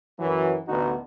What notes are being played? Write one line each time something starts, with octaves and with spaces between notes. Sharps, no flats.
F#2 E3 F#3
A1 D2 D3 B3 D#4 F#4